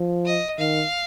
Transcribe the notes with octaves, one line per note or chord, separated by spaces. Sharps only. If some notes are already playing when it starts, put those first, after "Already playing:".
Already playing: F3
D#5
D#3 F5